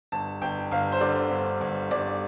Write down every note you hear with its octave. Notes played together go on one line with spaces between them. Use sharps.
G1 A5
G1 G5
G1 F5
C5
D3 D5
G1
G1
G1 D5